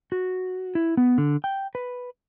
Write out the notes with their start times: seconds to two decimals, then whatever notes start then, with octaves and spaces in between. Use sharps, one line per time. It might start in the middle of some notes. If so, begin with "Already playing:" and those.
0.12 F#4
0.75 E4
0.97 B3
1.18 D3
1.44 G5
1.75 B4